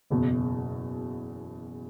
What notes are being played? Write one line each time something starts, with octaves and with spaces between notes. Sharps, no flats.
F#1 E2 B2